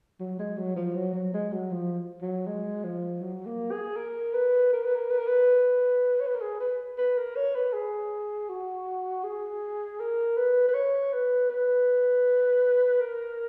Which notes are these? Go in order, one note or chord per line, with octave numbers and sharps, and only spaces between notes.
F#3
G#3
F#3
F3
F#3
F#3
G#3
F#3
F3
F#3
G#3
F3
F#3
A#3
G#4
A#4
B4
A#4
B4
A#4
B4
A#4
B4
C#5
B4
A#4
G#4
B4
B4
A#4
C#5
B4
G#4
F#4
G#4
A#4
B4
B4
C#5
B4
B4
A#4